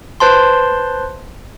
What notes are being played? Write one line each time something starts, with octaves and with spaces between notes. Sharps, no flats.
B4 C5 A5 C6